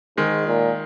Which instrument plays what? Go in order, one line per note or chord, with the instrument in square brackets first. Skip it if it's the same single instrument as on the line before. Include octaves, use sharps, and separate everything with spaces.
[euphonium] G#2 [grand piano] D#3 G#3
[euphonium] A#2